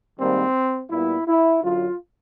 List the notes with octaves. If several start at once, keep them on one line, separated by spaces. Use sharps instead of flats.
G#2 D#3 G3 A#3 C4
A#2 G3 B3 E4
E4
F#2 D3 F#3 F4